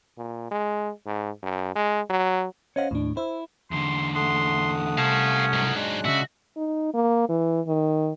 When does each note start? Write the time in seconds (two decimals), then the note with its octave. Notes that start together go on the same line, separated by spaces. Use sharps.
0.17 A#2
0.51 G#3
1.06 G#2
1.43 F#2
1.75 G#3
2.10 F#3
2.76 C#4 C5 C#5 D#5 F5 F#5
2.91 D#2 A2 D4
3.17 E4 C5 E6
3.71 E2 D3 C6
4.15 A3 F#5 C6 D#6
4.98 C2 C#4 F5 A5
5.53 G#2 F#3
5.75 G#3 D4 F#6
6.05 A#2 C#3 F#4 E5
6.57 D#4
6.94 A#3
7.29 E3
7.67 D#3